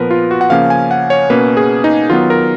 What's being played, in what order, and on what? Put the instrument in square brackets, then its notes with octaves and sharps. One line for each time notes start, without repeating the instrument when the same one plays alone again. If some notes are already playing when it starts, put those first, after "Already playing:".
Already playing: [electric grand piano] A#2 F3 B3 A#4 B4
F4
F#4
F#5
C#3 F3 A#3 C#4 F5
G#5
F#5
C#5
B2 A#3 C#4 B4
G#4
D#4
D#3 F#3 B3 F4
A#4